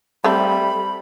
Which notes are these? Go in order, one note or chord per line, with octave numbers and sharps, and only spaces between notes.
G3 A3 C4 A4 B5